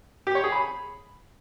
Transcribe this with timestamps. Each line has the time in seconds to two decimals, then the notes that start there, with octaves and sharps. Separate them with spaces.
0.27 G4
0.35 C#5
0.44 G#4
0.52 B5